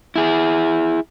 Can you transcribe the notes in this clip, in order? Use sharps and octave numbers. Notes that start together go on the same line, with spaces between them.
E4 G#4